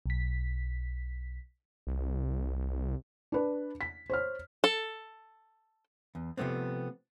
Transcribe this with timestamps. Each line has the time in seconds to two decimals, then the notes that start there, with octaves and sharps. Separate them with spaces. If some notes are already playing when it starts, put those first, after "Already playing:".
0.06 B1 B6
1.87 C2
3.32 D4 B4
3.81 B6
4.10 C5 C#5 F6
4.64 A4
6.15 E2
6.37 C3 F3 A3 B3 C4